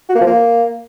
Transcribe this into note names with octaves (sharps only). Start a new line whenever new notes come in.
F#4
A#3
F3
A#3